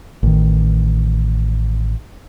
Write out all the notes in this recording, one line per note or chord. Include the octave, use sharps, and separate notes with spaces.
A1 D#3